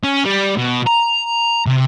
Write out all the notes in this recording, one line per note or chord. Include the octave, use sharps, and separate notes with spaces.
C#4
G3
B2
A#5
C3